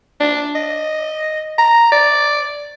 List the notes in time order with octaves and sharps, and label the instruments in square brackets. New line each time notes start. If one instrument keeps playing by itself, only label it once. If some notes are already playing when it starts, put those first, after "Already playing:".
[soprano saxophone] D4
D#5
A#5
D5